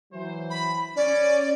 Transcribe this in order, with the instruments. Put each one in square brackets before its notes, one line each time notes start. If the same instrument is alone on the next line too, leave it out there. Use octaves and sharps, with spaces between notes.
[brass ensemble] E3 F#3 C5
[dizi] B5
[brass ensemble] C#4 [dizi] D5